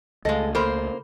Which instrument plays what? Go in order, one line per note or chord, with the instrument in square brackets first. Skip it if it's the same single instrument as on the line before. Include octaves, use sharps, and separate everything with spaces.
[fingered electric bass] C#2 A3 [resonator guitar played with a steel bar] G#3 A4 [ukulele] D#5 F5
[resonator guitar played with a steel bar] A#3 C5 [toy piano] A4 B5